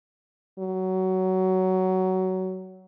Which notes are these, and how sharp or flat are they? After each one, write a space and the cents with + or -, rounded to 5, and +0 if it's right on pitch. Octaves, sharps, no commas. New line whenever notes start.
F#3 +15